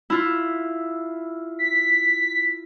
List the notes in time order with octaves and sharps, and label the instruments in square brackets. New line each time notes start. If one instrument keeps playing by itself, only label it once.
[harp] E4 F4
[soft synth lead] B6